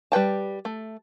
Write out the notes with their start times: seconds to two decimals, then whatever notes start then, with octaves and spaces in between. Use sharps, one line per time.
0.12 G3 B4 G5 A5
0.65 A3